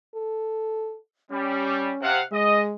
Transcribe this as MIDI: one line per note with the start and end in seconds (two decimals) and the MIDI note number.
0.15 0.98 69
1.31 1.92 55
1.31 2.09 61
2.02 2.21 48
2.02 2.21 77
2.02 2.21 78
2.32 2.76 56
2.32 2.62 75